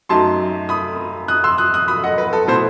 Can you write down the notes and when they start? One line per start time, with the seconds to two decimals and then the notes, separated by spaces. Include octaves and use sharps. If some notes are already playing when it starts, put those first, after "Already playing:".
0.09 F#2 F#3 A3 D#4 A5 C6
0.69 B5 D#6
1.28 D#6 F#6
1.44 C6 E6
1.58 D#6 F#6
1.74 D#6 F#6
1.88 B5 D#6
2.04 D#5 F#5
2.18 B4
2.33 A4
2.48 B2 A3 E4 A4 C5